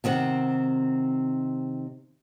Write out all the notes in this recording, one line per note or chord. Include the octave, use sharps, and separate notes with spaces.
C3 D#3 C4 F#5